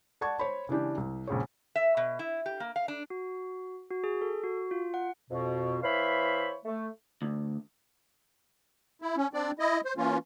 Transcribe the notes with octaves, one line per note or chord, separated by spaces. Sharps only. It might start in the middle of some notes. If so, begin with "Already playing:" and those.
D5 F#5 A5 C#6 G#6
C5 C#5 B5
C#3 E3 D4 G4
C2
A#1 C#3 G#4 C#5
E5
B2
E4
G4
A#3
F5
D4
F#4
F#4
G#4
A4
F#4
F4
F#5
F2 B2
E3 C5 C#5 E5 F5 B5
A3
D2
E4
C#4
C4 D4 D5
E4 D#5
C5
E3 A#3 C#4 F4